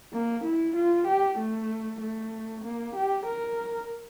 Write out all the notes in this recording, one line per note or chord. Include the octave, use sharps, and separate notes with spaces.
A#3
E4
F4
G4
A3
A3
A#3
G4
A#4